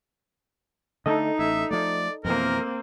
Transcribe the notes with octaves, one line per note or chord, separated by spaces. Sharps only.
D3 A3 D#4 A4 D#5
A1 E5
F3 A3 D5
F2 B2 E3 A#3 C4 A#4